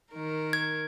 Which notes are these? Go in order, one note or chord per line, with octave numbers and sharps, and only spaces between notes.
D#3 A#4
G#6